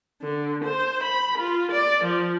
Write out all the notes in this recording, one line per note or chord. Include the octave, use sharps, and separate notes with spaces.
D3
C5
B5
F4
D5
F3